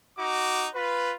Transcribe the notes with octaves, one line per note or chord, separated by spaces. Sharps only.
D#4 F#4 D6
F4 B4